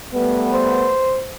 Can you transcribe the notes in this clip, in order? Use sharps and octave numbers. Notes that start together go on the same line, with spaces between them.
G3 A3 B3
C5